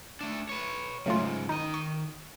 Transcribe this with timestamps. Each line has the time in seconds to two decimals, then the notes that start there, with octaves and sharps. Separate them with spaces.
0.21 A3 D4
0.49 B4 C#5
1.06 G#2 C#3 F#3 A3 F4
1.49 D#3 D#4 D#5
1.74 C#6